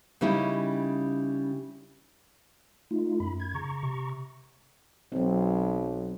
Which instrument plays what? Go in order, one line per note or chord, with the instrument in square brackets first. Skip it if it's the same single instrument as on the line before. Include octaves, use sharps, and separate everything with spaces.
[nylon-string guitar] C#3 G3 C#4 D#4 E4
[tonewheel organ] A3 D#4 F4
[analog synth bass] F#2 [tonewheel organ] B5
[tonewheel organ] G#6
[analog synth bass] C#3 [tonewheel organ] A#5 C#6
[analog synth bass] C3
[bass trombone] B1 [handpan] F#3 C4